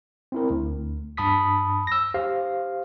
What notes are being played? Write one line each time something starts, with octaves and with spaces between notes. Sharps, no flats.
C4 E4 A#4
D2
G2 A5 B5 D#6 B6
E6 A#6
G4 C5 F5